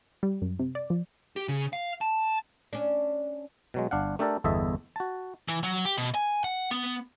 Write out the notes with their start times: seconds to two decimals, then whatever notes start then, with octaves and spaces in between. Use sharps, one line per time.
0.23 G3
0.42 F#2
0.59 C3
0.75 D5
0.90 F3
1.36 G4
1.48 C#3
1.73 F5
2.01 A5
2.73 C#4 D4
3.74 B2 F#3 G#3
3.91 G1 D4 F5 F#5
4.19 A3 D4 G4 A4 A#4 D5
4.44 G1 E2 A4 D#5 E5
4.96 F#4 A5
5.49 E3
5.63 F#3
5.85 G4
5.98 B2
6.15 G#5
6.44 F#5
6.71 B3